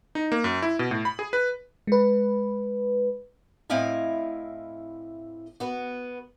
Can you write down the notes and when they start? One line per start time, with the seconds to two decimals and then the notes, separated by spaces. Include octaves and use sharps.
0.15 D#4
0.32 A#3
0.44 F#2
0.62 E4
0.79 B2
0.91 A2
1.05 B5
1.19 G#4
1.33 B4
1.87 G#3 B4
3.70 A2 C4 E4 D#5 F5 G#5
5.60 B3 F#4